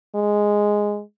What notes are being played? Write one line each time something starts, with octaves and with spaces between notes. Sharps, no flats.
G#3